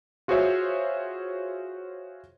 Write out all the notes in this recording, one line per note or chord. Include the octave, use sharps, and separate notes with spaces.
F4 F#4 G#4 C5 C#5 E5